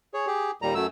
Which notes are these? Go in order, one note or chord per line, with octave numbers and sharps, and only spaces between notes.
G#4 C#5
G4 G#4
D#2 A#2 G3 A#5
F#2 F#3 A3 E6